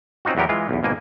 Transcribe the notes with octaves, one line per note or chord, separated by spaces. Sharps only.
C4 C#4 D#4 F4 F#4
E2 F#3 B3 G4 A#4
E3 G#3 F4
B1 E2
G#1 B2 A#3 G#5